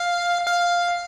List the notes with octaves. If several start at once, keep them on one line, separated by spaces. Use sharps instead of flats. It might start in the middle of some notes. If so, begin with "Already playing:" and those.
Already playing: F5
F5